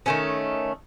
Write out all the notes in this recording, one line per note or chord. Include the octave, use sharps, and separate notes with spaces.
D#3 A3 C#4